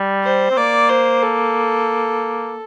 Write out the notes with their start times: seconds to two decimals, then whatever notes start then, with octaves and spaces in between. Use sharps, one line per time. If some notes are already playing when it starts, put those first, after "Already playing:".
Already playing: G3
0.24 C5
0.51 C4
0.57 A#3 D5
0.89 C5
1.23 A4